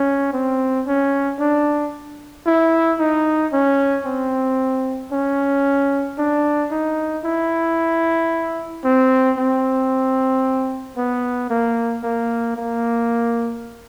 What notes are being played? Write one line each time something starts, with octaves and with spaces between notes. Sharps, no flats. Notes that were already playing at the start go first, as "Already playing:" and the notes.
Already playing: C#4
C4
C#4
D4
E4
D#4
C#4
C4
C#4
D4
D#4
E4
C4
C4
B3
A#3
A#3
A#3